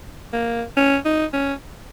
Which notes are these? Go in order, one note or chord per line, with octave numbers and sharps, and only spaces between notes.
A#3
C#4
D#4
C#4